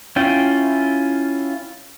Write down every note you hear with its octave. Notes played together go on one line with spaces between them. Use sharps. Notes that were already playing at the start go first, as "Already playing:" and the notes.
C#4 E4 F4 G5